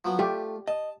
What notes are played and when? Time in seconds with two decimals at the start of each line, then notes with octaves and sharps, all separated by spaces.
0.05 F3 F#3 B3
0.19 A3 F4 G4
0.68 D#5 A5